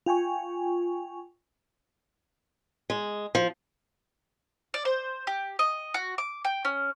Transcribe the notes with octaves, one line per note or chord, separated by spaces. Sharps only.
F4 G5 G#5 C#6
G#3
F3
D5
C5
G4
D#5
F#4
D6
G5
C#4